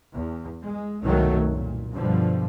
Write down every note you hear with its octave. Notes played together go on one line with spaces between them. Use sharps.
E2
G#3
C2 F#2 B2 D#3 F#3 A3
A#2
G2 B2 D3 F3 G3